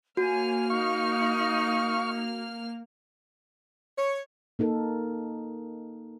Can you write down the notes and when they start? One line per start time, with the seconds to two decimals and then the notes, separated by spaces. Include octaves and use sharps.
0.17 A#3 F#4 C#5 G#5 F6
0.70 D#4 F5 C#6
3.98 C#5
4.59 A#3 D#4 A4 A#4